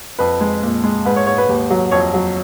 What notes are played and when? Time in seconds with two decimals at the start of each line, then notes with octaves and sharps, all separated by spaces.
0.19 F2 B4
0.41 G#3
0.63 A#2
0.83 G#3
1.05 G#2 B4
1.16 C#5
1.27 G#2 C#5
1.38 B4
1.49 D#2
1.70 F#3
1.92 F2 C#5
2.14 F#3